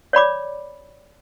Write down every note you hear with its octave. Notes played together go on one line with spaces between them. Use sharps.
C#5 D5 B5 D6